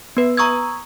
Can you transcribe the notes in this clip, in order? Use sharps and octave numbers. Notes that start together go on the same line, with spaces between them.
B3 B4
A#5 C#6 D#6 E6 G#6